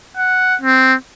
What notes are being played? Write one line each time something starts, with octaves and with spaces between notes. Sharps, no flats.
F#5
C4